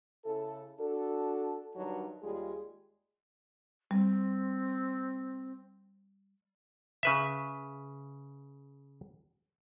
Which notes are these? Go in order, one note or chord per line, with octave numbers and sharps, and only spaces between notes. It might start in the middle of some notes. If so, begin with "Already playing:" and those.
C#3 E4 A4
D4 F#4 A4
G2 D#3 F#3 D#4
D#2 G3 G#3 F4 G#4
G3 C4
C#3 B4 E5